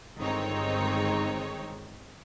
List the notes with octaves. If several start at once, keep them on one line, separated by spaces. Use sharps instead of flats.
G1 D#3 G#3 C4 D#4 C#5